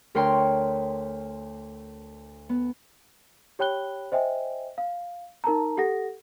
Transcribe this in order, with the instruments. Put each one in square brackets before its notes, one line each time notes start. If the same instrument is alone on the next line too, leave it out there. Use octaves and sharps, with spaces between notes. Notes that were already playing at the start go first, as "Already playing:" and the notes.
[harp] D2 A#4 C#5 G5 C6
B3
[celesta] G4 C#5 G5 B5 F#6 G7
C5 D#5 E5 G5 G#5
F5
D#4 A#4 A5 A#5
G4 A4 F#5 A#6